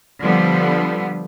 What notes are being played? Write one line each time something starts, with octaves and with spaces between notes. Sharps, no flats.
D3 F3 G3 B3